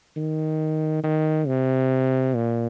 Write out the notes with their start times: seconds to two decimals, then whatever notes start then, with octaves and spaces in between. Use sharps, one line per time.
0.17 D#3
1.04 D#3
1.47 C3
2.34 A#2